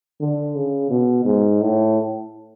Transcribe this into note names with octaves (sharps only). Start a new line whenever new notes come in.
D3
C#3
B2
G#2
A2